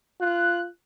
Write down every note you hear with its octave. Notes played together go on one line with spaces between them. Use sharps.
F4 F#6